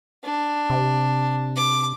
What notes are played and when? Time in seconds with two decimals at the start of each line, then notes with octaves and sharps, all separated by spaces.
0.24 D4
0.70 C3
1.56 D6